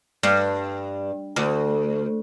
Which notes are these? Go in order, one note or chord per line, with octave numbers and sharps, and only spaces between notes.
G2
D2